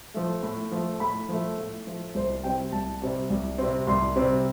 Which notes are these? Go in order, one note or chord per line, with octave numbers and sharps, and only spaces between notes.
F3 A3
A2
F3 A3
A2 B5
F3 A3
A2
F3 A3
C2 C5
C3 G3 C4 G5
C2 A5
C3 G3 C4
C2
C3 G3 C4
C2 C6
C3 G3 C4